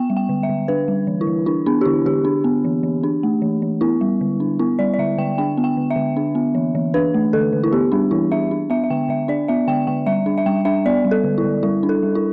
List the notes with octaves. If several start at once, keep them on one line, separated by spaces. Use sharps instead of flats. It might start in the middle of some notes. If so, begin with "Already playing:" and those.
Already playing: B3 G5
G3
G5
D3
E5
D3
D4 B4
G3
E3
E4
E3
D4 E4
B3 D4
G4
D3 E4
D3 G4
D4
B3
E3
E3
D4
A3
E3
E3
B3 E4
G3
D3
D4
B3 E4
G3 D5
D5
D3 E5
D3 G5
D4 G5
B3
G5
D3
E5
D3
D4
B3
E3
E3
D4 B4
A3
D3 A4
D3
E4
B3 G4
G3 D4
E3 E4
D4 E5
D4
B3 E5
E5
D3 G5
D3 E5
D4 D5
B3 E5
D3 G5
D3 G5
G3 E5
D4
E5
G3 G5
D4 E5
B3 D5
G3
A4
D3
E4
D3
G3 E4
D4
A4
G3
E4